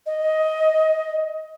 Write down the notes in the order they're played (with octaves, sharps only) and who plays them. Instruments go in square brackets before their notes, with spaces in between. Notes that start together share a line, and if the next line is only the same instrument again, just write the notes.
[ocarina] D#5